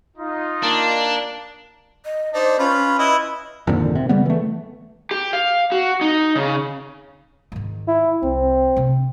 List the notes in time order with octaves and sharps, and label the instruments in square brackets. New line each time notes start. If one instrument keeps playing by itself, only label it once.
[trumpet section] D#4 F4
[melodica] A#3 A5 [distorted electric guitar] D4
[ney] D#5
[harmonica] D4 D#4 [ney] C5
[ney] C#4 [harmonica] F4 B4
[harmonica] E4 B4 D#5
[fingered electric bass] G#1 F2 A#2 D3
C3
C#3 G3 B3
E3 A3
[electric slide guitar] G4
F5
F#4
D#4
C#3
[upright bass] G#2 D#3
[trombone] E4
[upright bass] C2 [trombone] C4
[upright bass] C3 D4